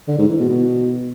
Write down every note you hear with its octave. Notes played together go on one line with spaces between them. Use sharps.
D3
G#2
E3
B2
B2